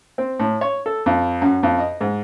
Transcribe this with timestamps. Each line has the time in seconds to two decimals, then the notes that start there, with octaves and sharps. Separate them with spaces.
0.18 C4
0.40 A2
0.61 C#5
0.86 A4
1.06 F2
1.42 F#2
1.63 F2
1.79 D#5
2.01 G#2